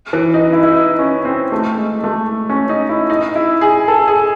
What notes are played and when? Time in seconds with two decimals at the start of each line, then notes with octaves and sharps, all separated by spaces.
0.13 E3
0.34 D#4
0.53 E4
0.63 E4
0.72 D#4
0.99 C#4
1.25 C4
1.52 A3
1.78 G#3
2.04 A3
2.50 C#4
2.69 D#4
2.89 E4
3.10 D#4
3.36 E4
3.61 G#4
3.88 A4
4.08 G#4